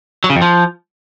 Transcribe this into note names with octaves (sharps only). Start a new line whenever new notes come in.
F#3
C#3
F2
F3